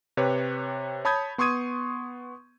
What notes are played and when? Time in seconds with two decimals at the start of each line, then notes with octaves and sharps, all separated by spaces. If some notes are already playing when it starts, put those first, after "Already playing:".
0.17 C3 G4 B4 C#5
1.05 C#5 A5 B5 D#6 G6 G#6
1.38 B3 C6 C#6 D#6 G#6 D#7